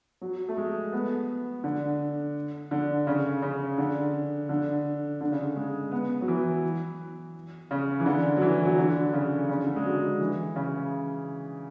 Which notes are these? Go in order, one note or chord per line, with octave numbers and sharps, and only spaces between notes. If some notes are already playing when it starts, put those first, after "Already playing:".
F#3
A3
G#3
B3
D3
D3
C#3
C#3
D3
D3
D3
C#3
G#3
B3
F#3
E3
C#3
E3
D3
F#3
E3
F#3
F#3
D3
C#3
C#3
D3
G#3
F#3
E3
C#3